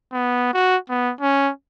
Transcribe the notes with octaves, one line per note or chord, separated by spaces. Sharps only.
B3
F#4
B3
C#4